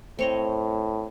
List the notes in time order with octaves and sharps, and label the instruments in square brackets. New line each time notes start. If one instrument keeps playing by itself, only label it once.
[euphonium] A2 [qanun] C4 C#5 D#5